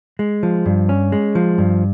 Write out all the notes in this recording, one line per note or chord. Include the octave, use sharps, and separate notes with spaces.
G#3
F3
G2
C#4
G#3
F3
G2